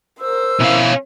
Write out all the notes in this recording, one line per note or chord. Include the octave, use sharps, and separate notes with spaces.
A#4 C5 E6
B2 C#4 E4 F5